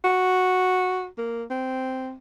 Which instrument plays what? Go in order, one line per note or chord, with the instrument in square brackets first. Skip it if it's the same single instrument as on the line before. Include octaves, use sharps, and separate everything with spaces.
[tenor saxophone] F#4
A#3
C4